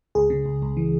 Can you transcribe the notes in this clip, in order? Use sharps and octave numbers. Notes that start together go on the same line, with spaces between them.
C#2 G#4
C#3
C#2
C#2
E3